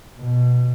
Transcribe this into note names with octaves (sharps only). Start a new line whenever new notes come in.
B2